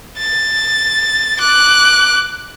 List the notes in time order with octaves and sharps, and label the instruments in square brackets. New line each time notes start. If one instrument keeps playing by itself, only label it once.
[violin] A6
D6 F#6